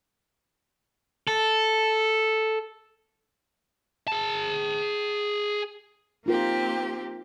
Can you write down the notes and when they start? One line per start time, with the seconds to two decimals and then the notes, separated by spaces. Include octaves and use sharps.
1.27 A4
4.08 G#4 A5
6.26 A#3 C4 D#4 F4 G4 A#4